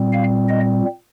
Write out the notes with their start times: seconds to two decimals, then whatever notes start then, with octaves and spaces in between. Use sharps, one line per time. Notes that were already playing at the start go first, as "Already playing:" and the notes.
Already playing: A#2 G3 C4
0.13 F5
0.49 D#5